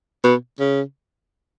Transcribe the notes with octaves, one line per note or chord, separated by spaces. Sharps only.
B2
C#3